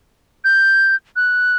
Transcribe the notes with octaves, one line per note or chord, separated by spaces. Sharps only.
G6
F#6